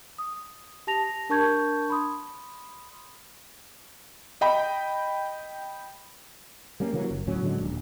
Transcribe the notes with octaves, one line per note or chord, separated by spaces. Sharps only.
D#6
G4 A5 A#6 F7
D4 A#4 A5 C#6 G6 G#6
B5 C6 D#6
D#5 G5 B5
G3 A#3 C#4
C#3 E3 F#3 A#3
F#1
D2 A2 F#3 C#4
A2 D3 F#3 G#3
D#1